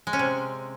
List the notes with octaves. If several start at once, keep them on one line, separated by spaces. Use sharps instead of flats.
G#3
C#4
C3